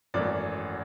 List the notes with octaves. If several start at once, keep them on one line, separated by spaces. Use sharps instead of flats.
G#1 F#2 E3 A3 D5